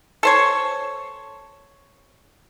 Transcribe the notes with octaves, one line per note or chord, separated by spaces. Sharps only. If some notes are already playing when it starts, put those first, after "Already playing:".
A4 C5 C#5